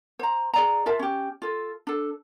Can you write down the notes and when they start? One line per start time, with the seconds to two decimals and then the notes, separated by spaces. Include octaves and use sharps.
0.19 C5 A#5
0.54 G#4 D5 A#5
0.86 F4 A#4 E5 A5
0.99 C#4 G4
1.42 F4 A4
1.87 D4 A4